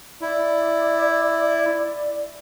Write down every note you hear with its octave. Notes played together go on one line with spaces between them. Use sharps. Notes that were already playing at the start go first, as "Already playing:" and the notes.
E4 D5